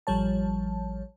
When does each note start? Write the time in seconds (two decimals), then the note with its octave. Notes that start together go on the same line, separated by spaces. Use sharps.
0.07 A1 F3 G3 C#5 A5